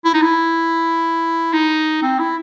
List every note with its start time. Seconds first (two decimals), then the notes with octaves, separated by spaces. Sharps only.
0.05 E4
0.14 D#4
0.22 E4
1.53 D#4
2.03 C4
2.19 E4